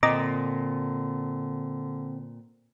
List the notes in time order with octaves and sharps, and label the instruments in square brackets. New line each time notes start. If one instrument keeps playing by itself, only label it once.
[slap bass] A#2 [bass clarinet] D3 [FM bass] C4 [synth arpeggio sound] D#5 A#5 D6